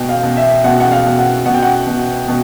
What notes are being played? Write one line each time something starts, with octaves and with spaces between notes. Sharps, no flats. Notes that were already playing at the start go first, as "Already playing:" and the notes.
Already playing: B2 G5
F5
B2
E5
B2 F#5
F#5
F5
B2
F#5
B2 F#5
G5
F#5
B2
B2